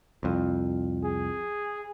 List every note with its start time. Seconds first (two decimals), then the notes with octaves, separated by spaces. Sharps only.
0.23 C2 F2
1.04 G#4